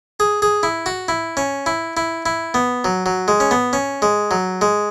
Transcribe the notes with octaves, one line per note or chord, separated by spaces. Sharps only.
G#4
G#4
E4
F#4
E4
C#4
E4
E4
E4
B3
F#3
F#3
G#3
C#4
B3
C#4
G#3
F#3
G#3